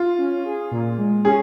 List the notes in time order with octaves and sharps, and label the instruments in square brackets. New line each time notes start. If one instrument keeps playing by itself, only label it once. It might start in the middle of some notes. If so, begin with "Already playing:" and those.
Already playing: [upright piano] F4
[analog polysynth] C#4
G#4
A#2
G#3
[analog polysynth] C#4 [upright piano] G#4